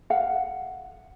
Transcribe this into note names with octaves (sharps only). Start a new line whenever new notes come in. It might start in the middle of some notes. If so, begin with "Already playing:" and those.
F5 F#5